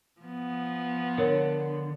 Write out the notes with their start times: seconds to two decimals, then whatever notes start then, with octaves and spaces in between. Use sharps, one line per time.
0.21 F3 B3
1.18 D3 A#4 C#5